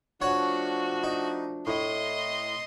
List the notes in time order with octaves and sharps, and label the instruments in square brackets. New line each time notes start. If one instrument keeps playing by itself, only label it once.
[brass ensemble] F3 A3 D4 [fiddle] F#4 [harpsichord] C#5 F#5
[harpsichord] D#4
[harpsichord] A2 [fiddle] D#5 C6